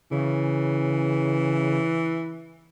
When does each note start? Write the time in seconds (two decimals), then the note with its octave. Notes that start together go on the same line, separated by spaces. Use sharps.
0.11 C#3 E3